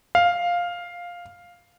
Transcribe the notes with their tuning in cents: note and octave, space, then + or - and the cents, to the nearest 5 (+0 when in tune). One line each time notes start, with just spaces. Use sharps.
F5 +5